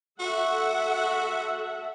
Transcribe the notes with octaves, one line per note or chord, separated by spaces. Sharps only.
F#4 A4 E5 F#5